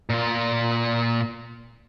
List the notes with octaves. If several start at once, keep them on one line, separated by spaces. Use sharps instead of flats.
A#2 F4